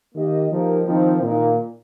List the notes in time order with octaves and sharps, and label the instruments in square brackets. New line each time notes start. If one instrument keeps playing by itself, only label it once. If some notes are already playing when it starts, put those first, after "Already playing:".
[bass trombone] D#3 [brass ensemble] A#3 G4 D#5
[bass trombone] F3 [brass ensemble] A#3 D#4 G4 A#4
[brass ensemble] D#3 C4 D#4 [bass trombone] F3
[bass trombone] A#2 [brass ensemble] D#3 A#3 D#4